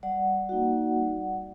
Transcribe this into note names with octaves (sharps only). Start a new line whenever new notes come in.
G3 D5 F#5
A#3 D#4 F#4
G3